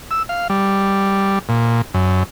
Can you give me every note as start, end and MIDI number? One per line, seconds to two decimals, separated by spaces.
0.11 0.23 88
0.29 0.48 77
0.50 1.39 55
1.49 1.82 46
1.94 2.23 42